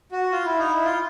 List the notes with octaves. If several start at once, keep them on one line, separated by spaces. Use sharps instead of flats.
F#4
F4
E4
D#4
E4
F4